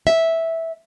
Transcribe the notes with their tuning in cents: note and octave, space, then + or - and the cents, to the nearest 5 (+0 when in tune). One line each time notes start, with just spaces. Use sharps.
E5 -10